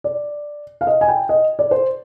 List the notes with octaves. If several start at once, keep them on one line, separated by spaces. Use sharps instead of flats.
D5
F5
D#5
G#5
G5
D#5
D5
C5